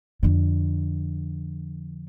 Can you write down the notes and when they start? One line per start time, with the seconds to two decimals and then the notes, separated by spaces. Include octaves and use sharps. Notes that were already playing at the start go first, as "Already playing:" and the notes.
0.23 F2 D3